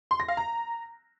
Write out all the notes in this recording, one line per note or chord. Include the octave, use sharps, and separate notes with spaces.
C6
A#6
F5
A#5